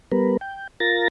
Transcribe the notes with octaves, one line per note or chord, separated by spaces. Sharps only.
G3 B3 A#4 B4
G5
F4 A#4 A6 A#6